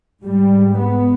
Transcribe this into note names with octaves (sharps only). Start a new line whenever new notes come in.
G#2 G3
B3